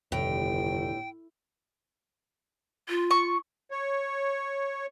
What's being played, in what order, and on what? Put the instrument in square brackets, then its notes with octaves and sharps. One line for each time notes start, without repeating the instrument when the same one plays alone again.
[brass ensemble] G1 [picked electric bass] F2 C3 D#3 [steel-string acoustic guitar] A2 [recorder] G5
[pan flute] F4
[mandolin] C#6
[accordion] C#5